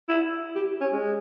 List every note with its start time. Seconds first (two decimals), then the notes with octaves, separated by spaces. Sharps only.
0.09 E4
0.55 G4
0.81 C#4
0.92 G#3